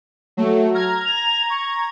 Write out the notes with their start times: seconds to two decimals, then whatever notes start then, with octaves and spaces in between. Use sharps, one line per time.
0.37 F#3 A3
0.74 A#5 F6 G#6
1.04 F7
1.50 C#6